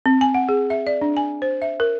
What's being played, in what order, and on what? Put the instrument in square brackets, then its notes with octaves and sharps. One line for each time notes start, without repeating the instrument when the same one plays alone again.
[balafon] C4
G#5
F#5
G#4
E5
D5
D4
G#5
C5
E5
A#4